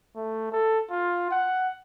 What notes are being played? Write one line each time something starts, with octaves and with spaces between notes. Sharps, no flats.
A3
A4
F4
F#5